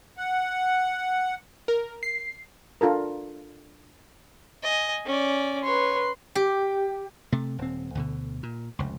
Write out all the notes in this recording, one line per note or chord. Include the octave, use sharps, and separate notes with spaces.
F#5
A#4
C7
D4 F4 A4 A#4
D#5 G#5
C#4 D5
B4 C#5 C6
G4
C3 A3
D#1 C4
D2 B2 D3
A#2
F1 C#2